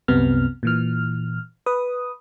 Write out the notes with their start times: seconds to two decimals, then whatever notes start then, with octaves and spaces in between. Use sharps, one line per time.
0.08 C2 F#2 C3 B3 F6
0.63 A#2 E3 F6
1.66 B4 D#6